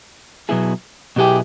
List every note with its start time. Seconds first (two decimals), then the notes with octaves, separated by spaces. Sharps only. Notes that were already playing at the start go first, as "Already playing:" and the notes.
0.49 B2 F#3 B3 E4 G#4
1.16 B2 F#3 B3 E4 G4 G#4